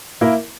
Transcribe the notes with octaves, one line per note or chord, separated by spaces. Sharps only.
A#3 E4 A#4